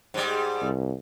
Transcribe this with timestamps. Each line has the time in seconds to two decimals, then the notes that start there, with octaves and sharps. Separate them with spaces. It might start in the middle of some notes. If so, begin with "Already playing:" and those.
0.14 G#2 G3
0.62 C2